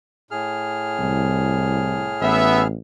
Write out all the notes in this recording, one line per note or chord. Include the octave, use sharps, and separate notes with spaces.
A2 G#4 F6
C2
A1 B3 E5